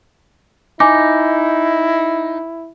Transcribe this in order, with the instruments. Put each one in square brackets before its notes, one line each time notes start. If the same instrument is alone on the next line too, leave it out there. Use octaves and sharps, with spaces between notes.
[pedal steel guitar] D#4 [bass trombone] E4 [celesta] G#5 D6